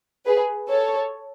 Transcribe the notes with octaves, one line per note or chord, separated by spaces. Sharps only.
G#4 B4
A4 C#5